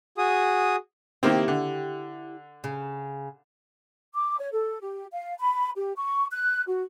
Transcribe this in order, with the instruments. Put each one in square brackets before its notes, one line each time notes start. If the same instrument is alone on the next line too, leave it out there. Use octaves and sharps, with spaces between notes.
[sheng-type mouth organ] F#4 G#4 D#6
[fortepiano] D#3 A#3 C4 [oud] E4 G4
[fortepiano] D3
[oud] C#3
[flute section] D6
C#5
A4
G4
F5
B5
G4
C#6
F#6
F#4